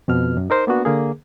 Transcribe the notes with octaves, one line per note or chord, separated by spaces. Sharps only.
F2 B2 F6
F#2
D#4 A#4 C5
A#3 B3 D4 F#4
D3 A#3 G#4